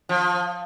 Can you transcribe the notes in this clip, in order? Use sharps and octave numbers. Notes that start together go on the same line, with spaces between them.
F3